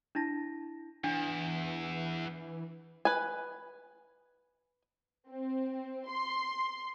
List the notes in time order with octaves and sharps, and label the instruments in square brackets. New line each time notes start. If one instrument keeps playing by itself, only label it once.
[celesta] D4 E4 A5 A#6
[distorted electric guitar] E2 [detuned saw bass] E3 [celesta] D4
[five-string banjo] B4 G#5
[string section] C4
C6